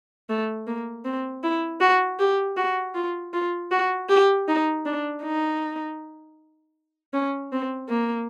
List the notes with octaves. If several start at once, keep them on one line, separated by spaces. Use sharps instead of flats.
A3
A#3
C4
E4
F#4
G4
F#4
F4
F4
F#4
G4
D#4
D4
D#4
C#4
C4
A#3